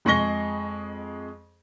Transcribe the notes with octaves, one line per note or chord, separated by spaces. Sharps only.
F2 G#3 G#4 C#6 A#6 G7